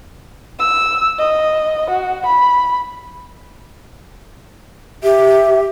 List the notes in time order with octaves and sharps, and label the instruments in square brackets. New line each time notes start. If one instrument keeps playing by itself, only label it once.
[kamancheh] E6
D#5
F#4
B5
[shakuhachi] G4 [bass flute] E5